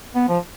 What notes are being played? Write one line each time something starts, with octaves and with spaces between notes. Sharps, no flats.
B3
F3